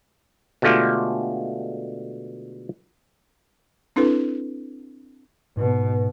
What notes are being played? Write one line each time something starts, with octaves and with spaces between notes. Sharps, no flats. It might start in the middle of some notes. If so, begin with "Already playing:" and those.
B2 D3 G#3 A3 F4 G4
C4 D4 E4 A4 B4
G#2 B2